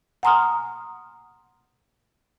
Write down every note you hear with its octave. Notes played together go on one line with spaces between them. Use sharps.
F#5 G#5 A#5 C6 D#6 F6